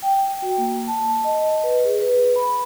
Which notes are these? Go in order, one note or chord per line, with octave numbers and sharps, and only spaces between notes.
G5
F#4
A#3
A5
D#5
B4
G#4
B4
B5